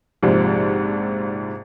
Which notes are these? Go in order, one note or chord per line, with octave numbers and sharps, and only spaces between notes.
A#1 G#2 C3 F3